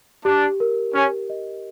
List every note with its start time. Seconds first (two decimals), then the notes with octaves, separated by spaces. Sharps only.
0.25 D4 G4
0.60 A#4
0.95 C#4 G4
1.30 D#5